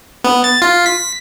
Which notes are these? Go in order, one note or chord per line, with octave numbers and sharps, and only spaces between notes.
B3
A6
F4
B6